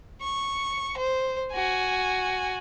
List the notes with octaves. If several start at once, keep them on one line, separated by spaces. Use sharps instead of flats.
C#6
C5
F#4 G#5